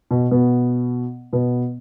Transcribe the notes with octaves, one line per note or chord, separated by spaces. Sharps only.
B2 B3
B2 B3
B2 B3